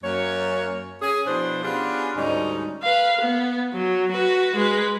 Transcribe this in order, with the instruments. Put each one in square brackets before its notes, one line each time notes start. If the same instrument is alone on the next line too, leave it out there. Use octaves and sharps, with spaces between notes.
[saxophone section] F#2 A#3 C#5
C#4 G#4
B2 F3 D4 E4 C5
B3 C#4 D4 F4 G4 G#4
D2 G#2 G3 C#4 D#4
[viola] B4 F5
B3
F#3
F#4 B4
G#3 B4